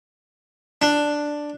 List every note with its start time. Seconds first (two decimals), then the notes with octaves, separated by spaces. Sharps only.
0.82 D4